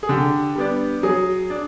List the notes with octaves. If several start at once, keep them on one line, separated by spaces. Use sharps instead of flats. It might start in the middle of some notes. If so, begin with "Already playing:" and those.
G#4
D3 G4
G3 B3 D4
F#3 G#4
D4